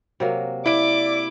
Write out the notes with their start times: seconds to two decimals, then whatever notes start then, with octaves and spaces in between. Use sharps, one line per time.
0.20 C3 F#3 A#3
0.66 E4 D5 D6 D7